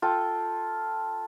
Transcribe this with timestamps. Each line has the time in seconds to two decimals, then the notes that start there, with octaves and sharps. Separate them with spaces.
0.02 F4 A4 G5